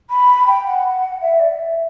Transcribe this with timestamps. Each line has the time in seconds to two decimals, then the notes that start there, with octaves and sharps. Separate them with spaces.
0.10 B5
0.46 G5
0.66 F#5
1.21 E5
1.39 D5
1.59 E5